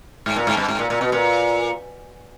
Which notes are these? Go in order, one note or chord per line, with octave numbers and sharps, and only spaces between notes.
G#2
A#2
G#2
G2
G#2
A#2
A#2
B2
A#2